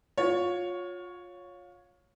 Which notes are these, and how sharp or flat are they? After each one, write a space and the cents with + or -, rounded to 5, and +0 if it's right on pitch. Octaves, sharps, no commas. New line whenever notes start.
F4 +25 C#5 +0 F#5 -10